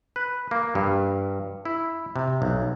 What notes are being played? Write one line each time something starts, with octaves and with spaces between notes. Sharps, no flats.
B4
A#3
G2
E4
C3
B1